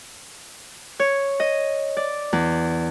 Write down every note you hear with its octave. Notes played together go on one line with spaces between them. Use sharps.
C#5
D#5
D5
E2